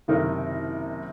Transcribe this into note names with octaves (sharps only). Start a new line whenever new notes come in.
F#1 C3 D#3 D#4 A#4